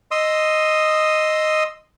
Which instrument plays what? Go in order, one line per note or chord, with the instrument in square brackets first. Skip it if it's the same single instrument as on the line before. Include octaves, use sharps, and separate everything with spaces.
[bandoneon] D#5 C6 D#6 E6